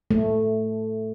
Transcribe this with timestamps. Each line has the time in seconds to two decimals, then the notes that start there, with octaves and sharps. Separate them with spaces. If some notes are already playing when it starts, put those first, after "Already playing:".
0.11 A3